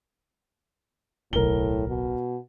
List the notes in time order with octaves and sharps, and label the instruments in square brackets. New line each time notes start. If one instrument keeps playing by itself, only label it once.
[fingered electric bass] D1 B1 [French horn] A2 [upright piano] A#4 G7
[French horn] B2